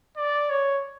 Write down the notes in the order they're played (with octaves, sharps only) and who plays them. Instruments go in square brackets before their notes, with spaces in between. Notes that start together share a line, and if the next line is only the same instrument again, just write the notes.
[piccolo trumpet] D5
C#5